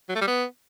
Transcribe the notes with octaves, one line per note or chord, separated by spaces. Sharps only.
F#3
A3
G3
B3